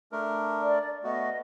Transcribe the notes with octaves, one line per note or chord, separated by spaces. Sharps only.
A3 D4 A#4
D5
A3 B3 F#4 D#5